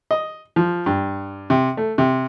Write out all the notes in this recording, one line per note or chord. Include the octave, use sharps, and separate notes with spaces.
D#5
F3
G2
C3
A3
C3